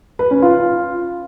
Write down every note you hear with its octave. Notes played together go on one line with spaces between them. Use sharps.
B4
C#4
F4